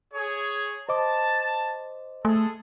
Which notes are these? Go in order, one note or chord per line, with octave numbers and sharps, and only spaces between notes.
G#4 C#5
C5 D#5 A5 D6
G#3 A3 G#4 A4